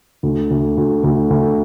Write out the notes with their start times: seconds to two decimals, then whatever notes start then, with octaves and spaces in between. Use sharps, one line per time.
0.23 D2
0.51 D2
0.77 D2
1.04 D2
1.30 D2